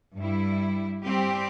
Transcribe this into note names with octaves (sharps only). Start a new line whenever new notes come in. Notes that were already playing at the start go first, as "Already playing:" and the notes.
G2 G3 E4
G3 C4 G4